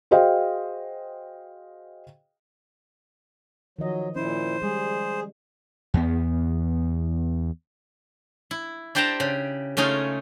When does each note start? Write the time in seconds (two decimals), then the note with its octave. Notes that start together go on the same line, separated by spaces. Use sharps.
0.11 F#4 G#4 C5 D#5 F5 G5
3.79 D#3 F3 F#3 D#5
4.16 A#2 C#4 E4 C5
4.62 G3 G#3 G#4
5.94 E2 B3
8.51 E4
8.95 D4 G4 C5 G5 A5 A#5
9.20 C#3
9.77 C#3 A3 C#4 D#4 F4 G#4